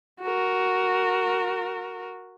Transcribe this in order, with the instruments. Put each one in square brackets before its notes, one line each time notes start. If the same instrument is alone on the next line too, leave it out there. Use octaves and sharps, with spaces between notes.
[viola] F#4 A#4